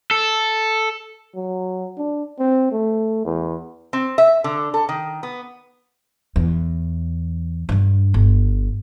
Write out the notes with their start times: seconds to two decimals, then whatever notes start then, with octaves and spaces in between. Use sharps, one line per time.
0.11 A4
1.35 F#3
1.98 D4
2.39 C4
2.72 A3
3.25 E2
3.93 C4
4.18 E5
4.44 D3
4.74 A4
4.89 D#3
5.23 B3
6.36 E2
7.69 G2 D3
8.14 G1